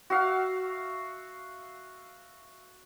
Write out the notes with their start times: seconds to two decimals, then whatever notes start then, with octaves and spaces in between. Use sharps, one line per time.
0.10 F#4 E5 F5